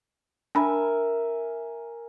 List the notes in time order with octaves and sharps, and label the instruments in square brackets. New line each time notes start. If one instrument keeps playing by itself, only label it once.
[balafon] D4 B5 [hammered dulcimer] A#4 E5 G#5